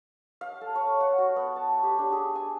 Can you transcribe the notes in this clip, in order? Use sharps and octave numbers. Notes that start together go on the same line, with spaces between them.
F5
A4
C#5
F#5
F#4
B3
A5
G4
D4
G#4
G#5